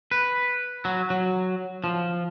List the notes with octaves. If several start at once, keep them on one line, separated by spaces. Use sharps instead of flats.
B4
F#3
F#3
F3